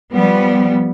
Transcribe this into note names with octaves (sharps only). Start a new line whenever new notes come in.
F3 G3 B3